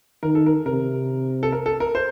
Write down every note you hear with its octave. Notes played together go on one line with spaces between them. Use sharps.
D#3 A#4
A4
A#4
C3 A#4
A4
A#4
A4
A#4
C5